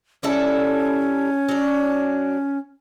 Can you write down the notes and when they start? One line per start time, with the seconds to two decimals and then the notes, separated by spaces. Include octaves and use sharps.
0.23 G3 C#4 E4 A4
1.49 F#3 D4